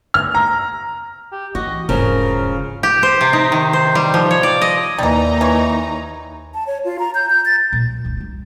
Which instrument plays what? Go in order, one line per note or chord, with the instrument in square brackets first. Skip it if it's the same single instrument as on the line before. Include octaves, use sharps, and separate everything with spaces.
[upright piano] F6
A#5
[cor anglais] G4
[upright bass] E3 [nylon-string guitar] F#4 [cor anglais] D#5
[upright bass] E1 G#2 [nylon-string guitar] C#3 F3 [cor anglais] A#4
[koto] G4
C5
C3
D#4
D#3
C5
G3
F3
C#5
D5
D#5
[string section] D#2 D#4 A#5 [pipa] E3 G3
[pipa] E3 C#5
[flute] A5
C#5
F4
A#5
G6
G6
A6
[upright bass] A#2 G3
E1 C#2
G3 C4